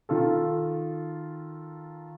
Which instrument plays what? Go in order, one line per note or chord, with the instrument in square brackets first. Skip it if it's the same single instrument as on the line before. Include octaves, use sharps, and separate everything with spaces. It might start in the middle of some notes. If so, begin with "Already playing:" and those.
[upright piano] D#3 F4 A4